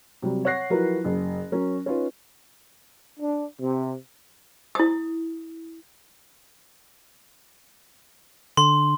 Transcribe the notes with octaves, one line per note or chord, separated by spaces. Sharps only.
C3 F#3 G3
C#5 F#5 F#6 A#6 C7
F3 F#3 E4 F#4 A#4 B4
F#1
F#3 C#4 A#4
C#4 D#4 F4 B4
D4
C3
E4 D#6
D3 C6